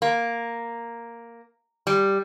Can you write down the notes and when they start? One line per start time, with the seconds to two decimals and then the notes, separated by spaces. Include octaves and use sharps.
0.02 A#3
1.87 G3